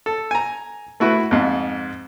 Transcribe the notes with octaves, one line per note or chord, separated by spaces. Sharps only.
A4
G#5 A#5
A3 E4 F#4 B4
F2 G#2